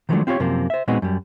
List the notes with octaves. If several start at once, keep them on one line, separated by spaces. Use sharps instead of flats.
D#3 F3 F#3 G#3 A3 D4
C4 F4 G4 A#4 C#5
F#2 C3 F3 A#3
C5 E5
A#2 G#3 B3 C4 D#4 F#4
F#2 G3